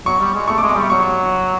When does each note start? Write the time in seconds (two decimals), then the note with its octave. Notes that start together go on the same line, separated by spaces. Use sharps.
0.06 F#3 C#6
0.20 G3
0.34 G#3
0.48 A3 C#6
0.58 D6
0.62 G#3
0.69 D6
0.75 G3 C#6
0.90 F#3 C#6
1.00 C#6